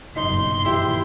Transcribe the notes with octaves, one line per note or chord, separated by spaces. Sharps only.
F#1 B1 G2 D#4 C6
A#2 D#3 E3 E4 G4 E5